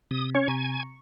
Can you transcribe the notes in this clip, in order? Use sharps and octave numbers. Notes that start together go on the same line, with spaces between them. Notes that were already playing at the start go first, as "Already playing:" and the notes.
C3 D#6
C#4 C#5
C3 G#5 A#5 C#6
C#6